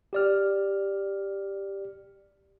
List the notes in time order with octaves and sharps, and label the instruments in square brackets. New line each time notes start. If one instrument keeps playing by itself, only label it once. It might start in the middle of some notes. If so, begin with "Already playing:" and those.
[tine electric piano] G4 D5 F6